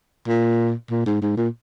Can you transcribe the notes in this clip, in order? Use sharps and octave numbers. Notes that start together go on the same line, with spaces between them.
A#2
A#2
G#2
G#2
A#2